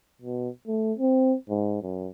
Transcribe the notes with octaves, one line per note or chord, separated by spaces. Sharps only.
B2
A3
C4
G#2
F#2